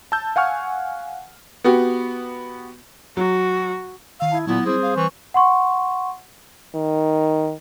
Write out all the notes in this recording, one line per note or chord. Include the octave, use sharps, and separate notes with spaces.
A5 E6 G6
F5 F#5 G#5 C#6 F6
B3 F#4 G4
F#3 F#4
D#3 F5 E6
E4 A5 D#6 G#6
A#2 F#3 B3 E4 A#6
G3 C4 G#4 C5
F5
E3 C#6
F#5 C6 C#6
D#3